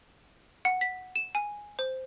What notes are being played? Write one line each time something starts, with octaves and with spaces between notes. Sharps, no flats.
F#5
B6
E7
G#5
C5